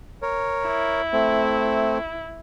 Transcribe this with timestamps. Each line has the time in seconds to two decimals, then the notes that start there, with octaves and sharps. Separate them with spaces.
0.22 A#4 C#5
0.66 E4
1.13 A3 C4